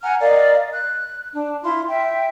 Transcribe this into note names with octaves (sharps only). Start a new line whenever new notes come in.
F#5 G#5 A#5 F6
A#4 D5 D#5 F5
F#6
D4
E4 F4 E5 C6
E5 G5